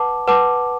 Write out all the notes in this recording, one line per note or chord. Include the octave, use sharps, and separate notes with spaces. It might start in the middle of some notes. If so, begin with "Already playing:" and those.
Already playing: B4 F#5 A5 D6
B4 F#5 A5 D6